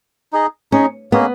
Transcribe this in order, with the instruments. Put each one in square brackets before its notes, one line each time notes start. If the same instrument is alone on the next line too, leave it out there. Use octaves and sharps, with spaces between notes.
[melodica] D#4 G#4 D#5
[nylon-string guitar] C#4 [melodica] D#4 G#4 D#5
[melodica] A#3 C#4 G#4 D#5 [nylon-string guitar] B3